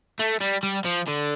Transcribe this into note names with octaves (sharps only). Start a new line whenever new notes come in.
A3
G3
G3
F3
D3